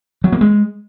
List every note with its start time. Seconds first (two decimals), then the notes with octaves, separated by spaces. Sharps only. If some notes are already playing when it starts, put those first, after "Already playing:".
0.24 F#3
0.32 A#3
0.41 G#3